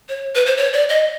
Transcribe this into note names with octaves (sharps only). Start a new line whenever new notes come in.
C#5
B4
C5
C#5
D5
D#5